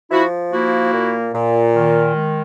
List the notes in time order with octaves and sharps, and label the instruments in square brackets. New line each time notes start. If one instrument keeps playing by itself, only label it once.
[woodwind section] F3 E4 F#4
A#3 E4 F#4
A#2
A#2
D#3
G#3